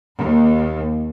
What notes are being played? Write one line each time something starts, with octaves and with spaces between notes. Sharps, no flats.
D#2